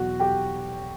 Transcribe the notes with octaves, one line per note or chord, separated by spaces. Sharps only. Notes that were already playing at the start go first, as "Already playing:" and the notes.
Already playing: E2 B2 F#3 F#4 F#5
G4 G5